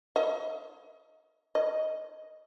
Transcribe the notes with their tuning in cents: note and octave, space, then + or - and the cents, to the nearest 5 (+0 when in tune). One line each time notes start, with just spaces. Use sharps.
D#5 +20
D#5 +15